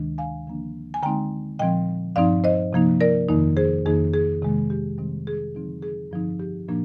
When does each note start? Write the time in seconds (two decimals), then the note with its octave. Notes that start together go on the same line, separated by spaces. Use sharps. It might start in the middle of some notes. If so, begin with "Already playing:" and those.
Already playing: D2 C3 D#3 G#3 D4
0.18 F5 G#5
0.47 D3 F3 A#3 D4
0.94 G#5
1.03 D3 G#3 C4 D#4 G5 A#5
1.59 A#2 F3 C4 D#5 G5
2.16 G2 F3 C4 D#4 D5 F5
2.44 C5 D#5
2.73 C3 F3 A#3 D#4
3.01 A#4 D5
3.29 F2 D#3 A#3 D#4
3.57 G#4 C5
3.86 F2 D#3 A#3 D#4 G#4
4.14 G#4
4.42 C3 D#3 G#3
4.70 G4
4.98 C3 D#3 G3 C4
5.27 G#4
5.55 D3 F3 C4 D#4
5.82 G#4
6.11 G2 D3 F3 C4 D#4
6.40 G4
6.68 A#2 F3 A#3 D4